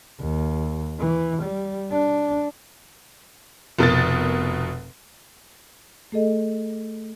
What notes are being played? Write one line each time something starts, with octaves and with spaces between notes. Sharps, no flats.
D#2
E3
G3
D4
F1 B2 A#4 A6
A3 G#4 A4 D#5